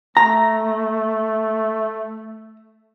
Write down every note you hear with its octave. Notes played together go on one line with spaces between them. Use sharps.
A3 A#5